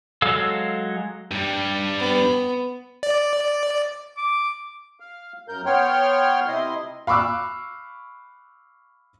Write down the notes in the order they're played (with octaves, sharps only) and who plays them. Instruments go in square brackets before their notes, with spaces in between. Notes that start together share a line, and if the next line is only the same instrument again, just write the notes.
[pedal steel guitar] F#3 G#3 A4 F5 E6
[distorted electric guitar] G2 G3
[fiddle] B3
[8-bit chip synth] D5
[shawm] D6
[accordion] F5
F#2 A#4 G6
B3 C#5 G5 C6 F6
C3 E4 D#5 C6
[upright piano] F5 B5 C#6 D6 E6 F#6